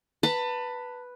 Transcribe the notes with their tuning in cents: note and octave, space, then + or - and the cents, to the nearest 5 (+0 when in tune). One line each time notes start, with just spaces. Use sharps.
B4 +0 A5 +30